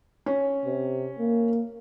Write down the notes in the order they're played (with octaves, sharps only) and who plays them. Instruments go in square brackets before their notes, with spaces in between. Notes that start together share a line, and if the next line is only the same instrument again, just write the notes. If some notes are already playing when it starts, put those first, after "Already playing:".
[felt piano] C#4
[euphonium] C3
A#3